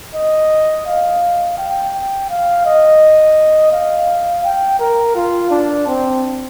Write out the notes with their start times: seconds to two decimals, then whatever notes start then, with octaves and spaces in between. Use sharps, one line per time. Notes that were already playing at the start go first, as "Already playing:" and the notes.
0.15 D#5
0.86 F5
1.58 G5
2.30 F5
2.66 D#5
3.72 F5
4.44 G5
4.80 A#4
5.16 F4
5.51 D4
5.87 C4